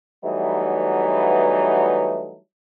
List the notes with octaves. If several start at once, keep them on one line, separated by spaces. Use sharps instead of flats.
E3 F#3 G3 A3 B3 D#4